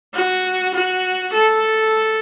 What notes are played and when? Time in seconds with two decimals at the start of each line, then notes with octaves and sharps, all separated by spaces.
0.14 F#4
0.74 F#4
1.33 A4